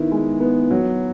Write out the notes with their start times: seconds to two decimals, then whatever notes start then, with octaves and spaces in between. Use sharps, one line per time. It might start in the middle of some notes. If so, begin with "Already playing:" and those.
Already playing: D#3 B3 E4
0.12 G#3
0.40 B3
0.71 F#3